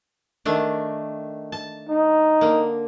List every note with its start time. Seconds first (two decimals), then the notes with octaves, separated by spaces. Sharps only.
0.45 D#3 A3 D4
1.52 A5
1.89 D#4
2.41 D3 A#3